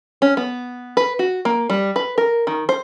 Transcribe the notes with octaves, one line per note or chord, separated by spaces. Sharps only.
C#4
B3
B4
F#4
A#3
G3
B4
A#4
D#3
C5